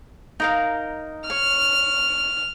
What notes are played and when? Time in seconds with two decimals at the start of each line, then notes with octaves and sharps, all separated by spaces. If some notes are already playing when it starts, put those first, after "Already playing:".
0.40 D#4 A#4 F5
1.30 C#5 F6